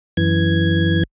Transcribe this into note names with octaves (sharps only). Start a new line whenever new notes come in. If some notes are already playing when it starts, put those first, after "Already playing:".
F#2 E3 G#6